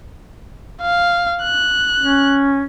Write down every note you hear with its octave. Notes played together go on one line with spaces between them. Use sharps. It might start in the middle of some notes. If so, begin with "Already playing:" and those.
F5
F#6
C#4